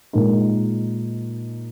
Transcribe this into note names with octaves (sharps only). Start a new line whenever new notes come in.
A#2 G#3 D#4 A#4